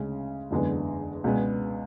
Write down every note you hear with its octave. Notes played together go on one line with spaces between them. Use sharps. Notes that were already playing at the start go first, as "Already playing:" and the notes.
Already playing: D2 C#3 G#3 C#4
F#1 E2 D3 G#3 B3
C#2 B2 G#3 B3 D4